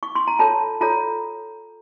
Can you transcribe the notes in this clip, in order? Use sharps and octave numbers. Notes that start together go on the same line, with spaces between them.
C#6
C6
A#5
F4 A4 C#5 A5
F4 A4 C#5 A#5